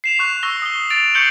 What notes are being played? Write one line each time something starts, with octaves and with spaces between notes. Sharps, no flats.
C7 E7 F7
C#6 F#6
C#6 E6 A#6 G7
D#6 G7
A6 D7 F7
C#6 G6 C7 C#7 F#7 G7